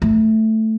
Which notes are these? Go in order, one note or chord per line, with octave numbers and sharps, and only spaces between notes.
A3